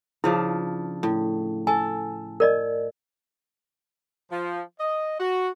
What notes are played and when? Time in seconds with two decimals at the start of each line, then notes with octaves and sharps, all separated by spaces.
0.24 C#3 F3 D4 E4
1.03 A2
1.67 A4 G#5
2.40 A#4 D5 D#5
4.31 F3
4.80 D#5
5.19 F#4